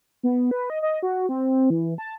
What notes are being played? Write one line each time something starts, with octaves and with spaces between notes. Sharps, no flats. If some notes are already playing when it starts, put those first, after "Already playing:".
B3
B4
D#5
D#5
F#4
C4
E3
A5